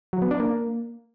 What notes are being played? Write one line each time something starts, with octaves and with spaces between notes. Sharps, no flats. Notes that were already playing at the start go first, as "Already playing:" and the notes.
F#3
B3
D4
A#3